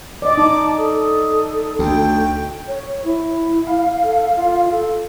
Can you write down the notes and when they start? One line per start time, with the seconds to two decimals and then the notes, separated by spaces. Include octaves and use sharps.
0.22 D5 D#5 D6
0.38 D#4 A5 D6
0.78 A4 D#6
1.79 D2 G5
2.67 C#5
3.04 E4
3.67 F5
4.03 A4
4.36 F4
4.70 A4